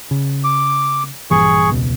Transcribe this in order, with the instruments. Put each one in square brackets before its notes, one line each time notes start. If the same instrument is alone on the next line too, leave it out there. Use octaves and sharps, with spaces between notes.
[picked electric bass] C#3
[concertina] D6
[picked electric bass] A#1 G2 E3 [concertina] G#4 C#6
[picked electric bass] E1 C#2 B2